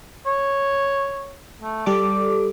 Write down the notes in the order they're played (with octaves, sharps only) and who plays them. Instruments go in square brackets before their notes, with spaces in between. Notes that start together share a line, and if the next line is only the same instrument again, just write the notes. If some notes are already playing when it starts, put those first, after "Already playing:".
[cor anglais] C#5
A3
[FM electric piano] G3 A4 D6 [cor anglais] D5